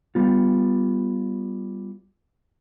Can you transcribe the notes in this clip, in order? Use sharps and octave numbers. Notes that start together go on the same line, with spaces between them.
G3 B3 F4